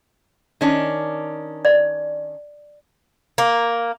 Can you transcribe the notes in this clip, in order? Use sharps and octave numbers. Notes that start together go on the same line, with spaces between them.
D#3 C#4 D4
D5
A#3